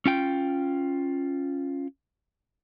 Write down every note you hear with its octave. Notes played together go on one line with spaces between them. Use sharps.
C#4 F4 G5